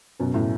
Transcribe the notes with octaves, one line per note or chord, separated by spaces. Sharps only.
F#2 B2
A2